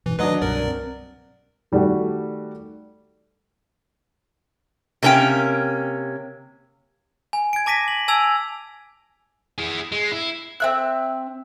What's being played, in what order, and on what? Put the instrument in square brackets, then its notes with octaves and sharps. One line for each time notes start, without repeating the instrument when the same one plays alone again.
[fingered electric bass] G#2 B2 [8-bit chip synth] E3
[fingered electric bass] D2 D#3 [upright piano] F#3 D4 [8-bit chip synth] B4 D#5 D#6
[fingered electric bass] C2 G2 B2 [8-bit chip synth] A#4 D5
[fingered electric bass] C4
[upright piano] D#3 G3 A3 F#4 A4 D5
[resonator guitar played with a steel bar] C3 A#3 C#4 F#4 G5
[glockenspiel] G#5
G#6 D7
A5 D6 A#6 B6 D#7
F#7
G#5 A5 E6 G#6 F7
[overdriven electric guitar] E4 G#4
G#3
E4
[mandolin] C4 E5 F#6